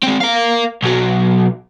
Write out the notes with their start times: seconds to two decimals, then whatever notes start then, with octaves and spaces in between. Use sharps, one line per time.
0.03 G#3 C4
0.20 A#4 F5
0.83 B1 F#3